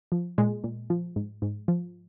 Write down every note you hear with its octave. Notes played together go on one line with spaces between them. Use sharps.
F3
A#2 G#3
A#2
F3
G#2
G#2
F3